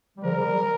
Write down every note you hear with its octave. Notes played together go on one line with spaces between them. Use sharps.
G3
C#3 F3 A#4
D#3 G3